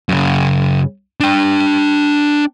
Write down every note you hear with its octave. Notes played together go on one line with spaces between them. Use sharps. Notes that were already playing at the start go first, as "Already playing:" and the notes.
F#2 C#3
D4 G5